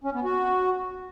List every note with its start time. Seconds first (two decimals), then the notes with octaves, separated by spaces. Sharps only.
0.04 C#4
0.14 B3
0.24 F#4